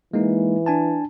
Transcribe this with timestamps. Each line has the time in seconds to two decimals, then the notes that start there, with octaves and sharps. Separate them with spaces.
0.14 E3 G#3 A#3 D#4
0.66 D4 G#5 A5